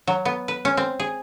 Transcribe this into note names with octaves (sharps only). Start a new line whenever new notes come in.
F#3
B3
B4
C#4
C4
G#4